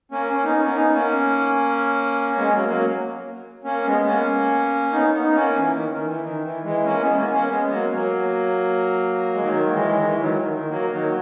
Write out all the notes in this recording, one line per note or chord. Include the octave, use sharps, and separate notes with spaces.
A#3 C#4
C#4
B3 D#4
A#3 C#4
B3 D#4
A#3 C#4
G#3 B3
B3
F#3 A#3
F#3 A#3
A#3 C#4
G#3 B3
A#3 C#4
B3 D#4
B3 D#4
A#3 C#4
E3
D#3
D#3
E3
D#3
E3
E3 G#3
A#3 C#4
G#3 B3
A#3 C#4
A#3 C#4
G#3 B3
F#3 A#3
F#3 A#3
G#3
D#3 F#3
F#3
E3 G#3
D#3
E3
D#3 F#3
D#3
D#3
F#3 A#3
D#3 F#3